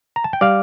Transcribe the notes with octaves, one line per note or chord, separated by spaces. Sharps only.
A#5
A5
G5
G3 D5 F5